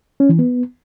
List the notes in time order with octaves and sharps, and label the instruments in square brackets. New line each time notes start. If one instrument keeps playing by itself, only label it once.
[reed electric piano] C#4
E3
B3